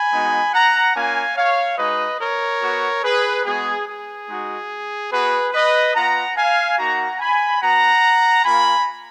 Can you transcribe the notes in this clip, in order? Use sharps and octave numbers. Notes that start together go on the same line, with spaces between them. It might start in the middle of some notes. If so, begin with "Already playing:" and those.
Already playing: G#5 B5
G#3 B3 D#4 F#4
F#5 A#5
A#3 C#4 F4 F5 G#5
C#5 F5
G#3 D#4 F#4 B4 D#5
A#4 C#5
B3 F#4
G#4 B4
G#3 B3 F#4 G#4
G#4
G#3 D#4 F#4
B3 F#4 G#4 B4
B4 D#5
B3 F4 F#5 A#5
F5 G#5
A#3 D#4 F#4 F#5 A#5
G#5 B5
B3 F#4 F#5 A#5
A#3 F4 G#5 B5